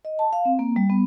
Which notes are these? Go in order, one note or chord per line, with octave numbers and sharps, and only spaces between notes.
D#5
A5
F5
C4
A#3
G3
B3